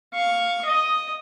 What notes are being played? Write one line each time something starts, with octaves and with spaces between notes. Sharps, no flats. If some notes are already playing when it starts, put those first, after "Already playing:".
F5 C#6
D#5